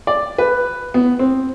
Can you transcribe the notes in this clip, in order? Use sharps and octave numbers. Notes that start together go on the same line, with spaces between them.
D5
B4
B3
C4